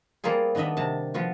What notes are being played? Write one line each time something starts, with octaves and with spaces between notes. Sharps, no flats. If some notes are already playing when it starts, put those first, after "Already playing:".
G3 A#3 C4 F4 G#4
D#3 B3 D4 D#5 E5
C3 A5
F3 B3 F4 F#4